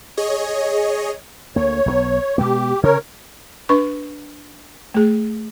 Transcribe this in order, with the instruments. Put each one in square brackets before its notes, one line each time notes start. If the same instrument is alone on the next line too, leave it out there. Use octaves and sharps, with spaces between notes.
[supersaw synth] G#4 C#5 D#5
[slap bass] D2 A#3 [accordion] C#5
[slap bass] B1 F#3 B3
[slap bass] B2 G#3 B3 [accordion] G4
[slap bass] C#3 [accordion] A#4 C#5
[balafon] D4 B4 C#6
A3 G#4